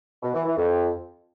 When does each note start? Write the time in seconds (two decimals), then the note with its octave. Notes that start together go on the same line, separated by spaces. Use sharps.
0.23 B2
0.34 E3
0.45 E3
0.57 F2